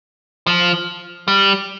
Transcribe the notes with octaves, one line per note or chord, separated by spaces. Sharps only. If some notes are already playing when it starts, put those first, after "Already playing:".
F3
G3